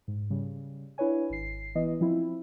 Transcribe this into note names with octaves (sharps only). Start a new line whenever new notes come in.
G#2
C#3 G3
D4 E4 B4 C#5 G#5
G#1 C7
E3 B3 D#5
F3 C4 E4